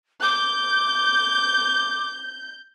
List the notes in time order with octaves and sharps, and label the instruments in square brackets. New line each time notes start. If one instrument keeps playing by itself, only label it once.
[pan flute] D6 [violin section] G6